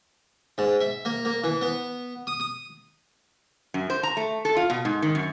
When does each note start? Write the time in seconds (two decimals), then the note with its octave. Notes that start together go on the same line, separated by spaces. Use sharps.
0.58 G#2
0.81 E5
1.05 A#3
1.25 A#3
1.44 E3
1.62 B3
2.27 D#6
2.40 D#6
3.74 F#2
3.90 C5
4.03 A#5
4.17 A3
4.45 A4
4.57 F4
4.70 B2
4.85 G#2
5.02 D#3
5.15 F#2